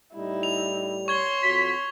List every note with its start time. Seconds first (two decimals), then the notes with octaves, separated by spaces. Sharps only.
0.15 A2 G3 D#4 E4
0.43 F7
1.08 C#5 C6 C#6 G#6 G7
1.43 F2 F#4 B6